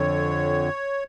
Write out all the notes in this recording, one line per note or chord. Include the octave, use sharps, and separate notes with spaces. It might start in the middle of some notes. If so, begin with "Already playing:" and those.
Already playing: F2 D3 C#5